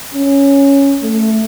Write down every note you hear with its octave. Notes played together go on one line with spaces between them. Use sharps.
C#4
A3